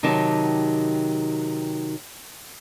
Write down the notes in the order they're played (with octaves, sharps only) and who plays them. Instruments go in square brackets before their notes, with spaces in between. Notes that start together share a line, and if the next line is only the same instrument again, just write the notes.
[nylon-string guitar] C3 D#3 F#3 D#4 G4 A5